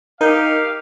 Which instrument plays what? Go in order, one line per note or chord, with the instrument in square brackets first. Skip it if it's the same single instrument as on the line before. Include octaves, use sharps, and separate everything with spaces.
[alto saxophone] D#4 [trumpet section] G4 F5 [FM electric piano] A#4 G6